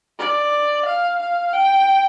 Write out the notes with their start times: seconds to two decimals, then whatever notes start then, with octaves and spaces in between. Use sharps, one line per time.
0.18 D5
0.86 F5
1.20 F5
1.53 G5